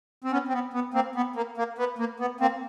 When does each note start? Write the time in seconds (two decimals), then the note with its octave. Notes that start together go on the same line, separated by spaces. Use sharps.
0.24 C4
0.32 B3 C#4
0.48 C4
0.53 B3
0.74 B3
0.94 A#3 C4
1.15 B3
1.36 A#3
1.57 A#3
1.78 B3
1.99 A#3
2.20 B3
2.40 A#3 C4